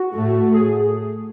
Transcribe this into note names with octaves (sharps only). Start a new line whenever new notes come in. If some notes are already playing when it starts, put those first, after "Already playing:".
Already playing: F#4
A2 A3
G#4